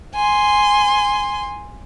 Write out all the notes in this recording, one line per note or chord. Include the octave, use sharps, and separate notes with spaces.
G#5 C6